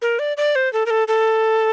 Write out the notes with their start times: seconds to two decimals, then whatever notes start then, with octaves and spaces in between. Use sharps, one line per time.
0.02 A#4
0.19 D5
0.37 D5
0.56 C5
0.73 A4
0.86 A#4
0.90 A4
1.08 A4